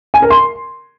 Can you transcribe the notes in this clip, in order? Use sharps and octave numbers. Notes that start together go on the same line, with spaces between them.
G#5
A#4
C6